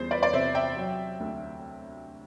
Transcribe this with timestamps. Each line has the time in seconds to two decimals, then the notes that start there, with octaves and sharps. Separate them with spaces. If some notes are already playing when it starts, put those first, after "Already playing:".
Already playing: E2 G3 C5
0.11 B4 D5
0.23 D5
0.33 C3 C5 E5
0.55 E5 G5
0.76 F#3
1.20 D2